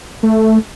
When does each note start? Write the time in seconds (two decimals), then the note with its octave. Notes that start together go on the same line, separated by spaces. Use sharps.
0.23 A3